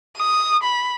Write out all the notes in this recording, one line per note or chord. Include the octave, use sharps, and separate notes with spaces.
D#6
B5